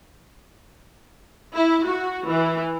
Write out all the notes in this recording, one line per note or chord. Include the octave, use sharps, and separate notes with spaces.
E4
F#4
E3